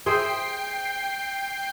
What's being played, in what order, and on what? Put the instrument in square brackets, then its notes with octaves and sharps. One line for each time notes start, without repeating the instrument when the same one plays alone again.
[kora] G#4 C5 E5 [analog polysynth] G5 C7